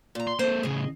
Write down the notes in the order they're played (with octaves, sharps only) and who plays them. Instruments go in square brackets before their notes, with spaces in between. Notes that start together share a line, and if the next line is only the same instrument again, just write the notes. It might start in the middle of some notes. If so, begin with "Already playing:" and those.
[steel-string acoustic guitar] A#2 A#5
[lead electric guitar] C6
[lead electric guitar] A#3 A4 [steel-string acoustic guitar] C5
[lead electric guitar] A2 C#3 [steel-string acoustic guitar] G#4 D#5